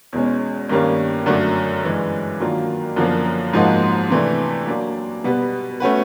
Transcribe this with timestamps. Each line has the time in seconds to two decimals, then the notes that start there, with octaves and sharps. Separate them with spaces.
0.13 E2 B2 G#3 C#4
0.69 G2 D#3 G3 A#3 C#4
1.26 F#2 D3 F#3 A3
1.83 G2 E3 G#3
2.40 D#3 F#3 A#3 D4 F4
2.96 F#2 D3 F3 A#3
3.53 G#2 F3 A#3 D#4 F#4
4.10 C3 E3 A3 D4
4.67 F#3 A#3 D4
5.24 B2 G3 B3
5.80 A3 C#4 F#4 B4